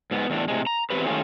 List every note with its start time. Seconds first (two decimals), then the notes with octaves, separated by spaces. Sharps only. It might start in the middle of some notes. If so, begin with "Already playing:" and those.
0.11 G#2 B3
0.30 E2 A2 D4
0.48 A2 C3 G#3
0.67 A#5
0.90 E2 F3 C4 G4 B4
1.06 D#3 A3 C#4 F4 G4 G#4